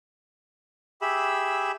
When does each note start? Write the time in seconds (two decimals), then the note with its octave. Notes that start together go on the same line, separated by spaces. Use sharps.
1.02 G4 G#4 E5 B5 E6